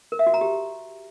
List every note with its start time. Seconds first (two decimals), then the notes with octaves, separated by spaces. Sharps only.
0.12 A#4
0.19 E5
0.27 F#4
0.34 A#5
0.41 G4